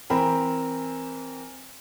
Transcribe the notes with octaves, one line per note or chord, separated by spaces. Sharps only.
E3 C4 A#4 B5